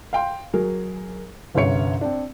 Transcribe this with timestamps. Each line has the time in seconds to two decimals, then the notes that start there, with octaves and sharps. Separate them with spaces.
0.13 F5 G5 C6
0.53 F#3 G#4 A#4
1.54 G1 C2 C#4 G#4 C#5 C#7
2.01 C4 D4